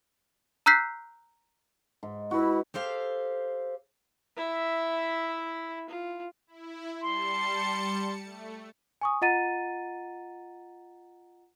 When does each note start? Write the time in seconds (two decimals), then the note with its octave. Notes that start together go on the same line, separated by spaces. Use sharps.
0.66 A#5 E6 F#6 G6 B6 C7
2.03 G#2
2.31 E4 F#4 B4
2.74 G4 A4 C5 F5
4.37 E4 E5
5.89 F4
6.47 E4
7.02 G3 A5 C6 C#7
8.25 A3
9.01 G#5 C#6 D#6
9.22 F4 D#5 F#5 A#5 A6 D#7